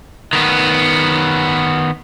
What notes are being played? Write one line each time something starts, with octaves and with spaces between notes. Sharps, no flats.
D#3 B3